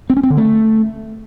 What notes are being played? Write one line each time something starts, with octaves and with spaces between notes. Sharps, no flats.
C4
C#4
C4
D3
A3